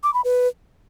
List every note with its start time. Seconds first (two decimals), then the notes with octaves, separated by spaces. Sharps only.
0.03 D6
0.14 B5
0.24 B4